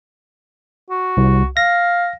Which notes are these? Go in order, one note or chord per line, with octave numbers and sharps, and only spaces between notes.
F#4
C2
F5 A#6